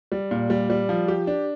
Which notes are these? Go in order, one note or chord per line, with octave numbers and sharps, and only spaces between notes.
G3
A#2
G3
G3
F3
G4
D4